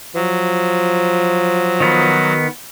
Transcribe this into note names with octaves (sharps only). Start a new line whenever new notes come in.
F3 F#3
D#3 B3